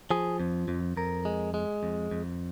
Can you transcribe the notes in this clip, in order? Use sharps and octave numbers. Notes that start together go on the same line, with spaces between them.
F3 G#4
F2
F2
F2 A#4
G#3
G#3
F2
F2